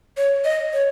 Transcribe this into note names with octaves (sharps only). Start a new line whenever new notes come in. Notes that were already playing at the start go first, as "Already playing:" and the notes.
C#5
D#5
C#5